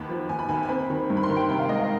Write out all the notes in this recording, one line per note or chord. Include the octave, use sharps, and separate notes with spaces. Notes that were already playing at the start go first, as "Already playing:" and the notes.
Already playing: D#2 B3 B5
F3
D#2 G#5
B5
D#2 G#5
G#5
C4 B5
D#3
G2
B5
C6
D#3
G5
C3 G5
F5
G#3 D#5
F5